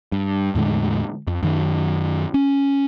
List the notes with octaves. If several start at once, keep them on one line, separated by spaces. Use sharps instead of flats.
G2
E2 A2 D3 G#3
F2
F#2 D#3 F#3
C#4